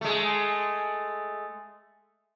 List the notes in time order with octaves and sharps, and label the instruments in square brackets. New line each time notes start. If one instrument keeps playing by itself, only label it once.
[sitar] G#3 A3